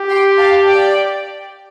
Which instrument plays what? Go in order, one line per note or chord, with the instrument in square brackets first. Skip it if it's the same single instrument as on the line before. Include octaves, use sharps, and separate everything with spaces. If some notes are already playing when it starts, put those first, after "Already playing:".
Already playing: [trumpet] G4
[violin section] G5 C6
F5 A5
D5 G5